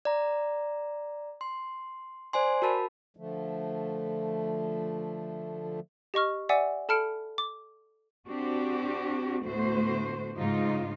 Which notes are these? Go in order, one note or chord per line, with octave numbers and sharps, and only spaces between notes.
D5 A#5
C6
C5 D5 G#5 C6
F#4 A#4 A5 B5
D3 F3 A3
G4 D#5 C#6 F6
D5 E5 F#5 G#5 D6 E6
A4 A5 B5 F6 C#7 D7
D6
C4 D4 F#4 G4
D2 A2 A3 B3 F#4 C5
G#2 C#3 D#4 F4